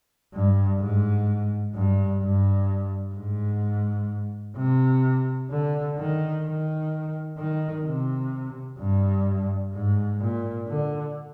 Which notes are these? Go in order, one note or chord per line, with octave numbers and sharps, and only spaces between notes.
G2
G#2
G2
G2
G#2
C3
D3
D#3
D#3
D#3
C3
G2
G#2
A#2
D3